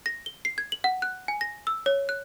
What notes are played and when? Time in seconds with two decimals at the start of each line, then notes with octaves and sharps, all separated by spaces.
0.06 A#6
0.26 G7
0.45 C7
0.58 G#6
0.72 F#7
0.84 F#5
1.02 F#6
1.28 G#5
1.41 A#6
1.67 E6
1.86 C#5
2.09 F#6